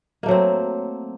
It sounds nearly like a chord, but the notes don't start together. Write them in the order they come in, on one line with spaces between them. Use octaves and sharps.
A#3 A3 F#3 C4